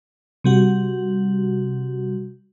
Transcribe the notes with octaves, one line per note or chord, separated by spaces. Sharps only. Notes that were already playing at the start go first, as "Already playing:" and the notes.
C3 G3 F#4